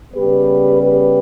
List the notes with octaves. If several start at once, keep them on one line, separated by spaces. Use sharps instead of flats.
C#3 G3 B3 G4 B4
G4 B4